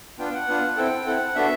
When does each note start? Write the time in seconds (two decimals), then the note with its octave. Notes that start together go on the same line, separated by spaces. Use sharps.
0.18 B3 D4 F4 G5
0.34 F#5
0.48 B3 D4 F4
0.77 C4 E4 A4 G5
1.05 C4 E4 A4 F#5
1.35 B3 D4 F#4 A4 E5